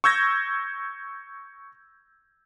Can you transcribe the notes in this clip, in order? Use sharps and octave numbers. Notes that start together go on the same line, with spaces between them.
C#6 E6 G6 G#6 A#6